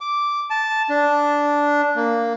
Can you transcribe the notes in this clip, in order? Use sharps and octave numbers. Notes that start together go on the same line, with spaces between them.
D6
A5
D4
A#3